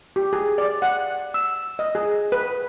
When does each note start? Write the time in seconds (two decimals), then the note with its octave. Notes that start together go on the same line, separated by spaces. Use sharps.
0.16 G4
0.33 G#4
0.58 D5
0.82 F#5
1.34 E6
1.79 D#5
1.95 G#4
2.32 B4